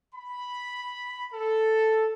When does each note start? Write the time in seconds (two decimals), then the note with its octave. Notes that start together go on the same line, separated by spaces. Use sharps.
0.15 B5
1.34 A4